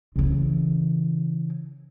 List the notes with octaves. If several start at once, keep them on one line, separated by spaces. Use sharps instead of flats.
C#3 E3